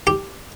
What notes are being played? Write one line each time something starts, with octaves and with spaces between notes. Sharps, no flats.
G4